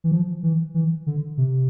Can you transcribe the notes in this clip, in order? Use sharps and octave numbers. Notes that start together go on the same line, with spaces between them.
E3
F3
E3
E3
D3
C3